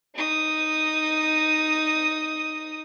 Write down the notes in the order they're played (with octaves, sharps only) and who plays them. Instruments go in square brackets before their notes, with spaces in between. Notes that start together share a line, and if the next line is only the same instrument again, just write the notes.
[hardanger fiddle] D#4 D#6